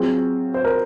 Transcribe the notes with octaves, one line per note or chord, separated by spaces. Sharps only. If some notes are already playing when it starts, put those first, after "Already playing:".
Already playing: F#3 C4 F4 G#4
C5
A#4